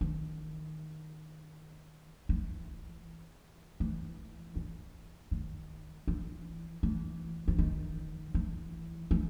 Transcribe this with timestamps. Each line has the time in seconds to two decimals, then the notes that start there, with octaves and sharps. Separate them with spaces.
0.01 D#3
2.29 E3
3.80 E3
4.56 E3
5.31 D#3
6.08 E3
6.83 E3
7.48 E3
7.59 D#3
8.34 E3
9.11 E3